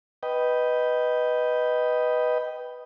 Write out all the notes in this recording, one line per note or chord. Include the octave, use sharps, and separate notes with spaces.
B4 D#5 G5